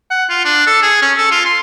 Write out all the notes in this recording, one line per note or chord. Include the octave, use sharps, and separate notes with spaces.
F#5
F4
D4
A4
G#4
C#4
A4
F4
C6